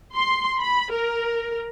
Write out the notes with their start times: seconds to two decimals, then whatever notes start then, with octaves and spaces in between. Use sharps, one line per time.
0.14 C6
0.59 B5
0.91 A#4